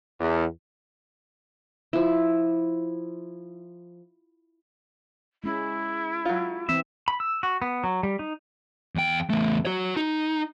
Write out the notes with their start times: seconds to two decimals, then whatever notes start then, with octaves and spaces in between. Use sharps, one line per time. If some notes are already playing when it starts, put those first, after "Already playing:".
0.20 E2
1.93 F3 E4
5.44 G#3 C#4 E4
6.25 F#3 F4
6.69 E3 C4 E5
7.08 B5
7.20 E6
7.43 F#4
7.62 B3
7.84 F#3
8.03 G3
8.19 D#4
8.96 E2 G5
9.30 E2 A3
9.65 F#4 C#5
9.96 D#4